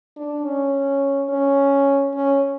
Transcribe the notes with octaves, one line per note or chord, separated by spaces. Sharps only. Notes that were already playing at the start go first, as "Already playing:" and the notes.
D4
C#4
C#4
C#4